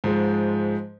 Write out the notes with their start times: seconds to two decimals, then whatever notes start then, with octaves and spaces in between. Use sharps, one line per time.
0.04 G#2 F3 G#3